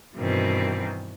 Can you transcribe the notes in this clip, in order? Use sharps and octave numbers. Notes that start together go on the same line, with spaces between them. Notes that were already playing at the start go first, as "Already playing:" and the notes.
G2 B2 D#3 E3 C4